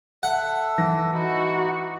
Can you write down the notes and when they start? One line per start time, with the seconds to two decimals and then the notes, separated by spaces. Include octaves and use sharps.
0.23 A4 E5 F#5
0.78 E3 A#6
1.14 D#4 E4 F#4